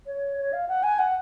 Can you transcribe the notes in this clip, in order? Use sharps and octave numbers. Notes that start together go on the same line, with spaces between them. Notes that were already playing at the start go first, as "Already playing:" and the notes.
C#5
C#5
F5
F#5
G#5
F#5